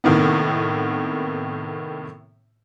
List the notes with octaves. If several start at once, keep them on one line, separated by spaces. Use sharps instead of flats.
A2 C3 D#3 A#3 B3